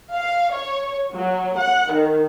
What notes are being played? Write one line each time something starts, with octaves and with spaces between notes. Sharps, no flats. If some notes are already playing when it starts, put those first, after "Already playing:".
F5
C#5
F#3
F#5
D#3